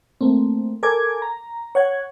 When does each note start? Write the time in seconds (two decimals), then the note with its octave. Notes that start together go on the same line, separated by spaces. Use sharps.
0.21 A3 A#3 C4
0.83 A4 A#4 G#5 D6 G#6
1.22 A#5
1.75 C#5 F#5 G#6